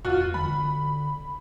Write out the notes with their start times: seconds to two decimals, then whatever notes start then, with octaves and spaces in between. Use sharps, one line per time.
0.05 E2 F4 F#4
0.34 D3 B5